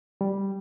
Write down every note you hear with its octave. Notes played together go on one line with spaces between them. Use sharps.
G3